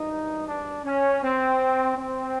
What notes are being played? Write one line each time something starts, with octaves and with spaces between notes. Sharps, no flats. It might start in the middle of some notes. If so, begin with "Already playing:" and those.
Already playing: G#1 G2 E3 D#4
D4
C#4
C4
C4